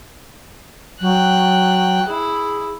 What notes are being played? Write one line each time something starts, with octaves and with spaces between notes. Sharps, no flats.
F#3 G5 F#6
E4 G#4